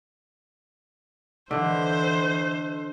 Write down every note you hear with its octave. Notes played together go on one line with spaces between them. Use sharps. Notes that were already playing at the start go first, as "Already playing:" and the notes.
D3 E3 A4 C5 D#5 F#6